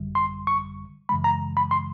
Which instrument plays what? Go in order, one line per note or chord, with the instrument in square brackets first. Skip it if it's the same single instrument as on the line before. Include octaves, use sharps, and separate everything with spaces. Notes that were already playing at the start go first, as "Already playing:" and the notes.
Already playing: [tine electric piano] G#1 F#2 D3 G3
C6
C#6
F#2 C#3 E3 G#3 B5
A#5
B5
C6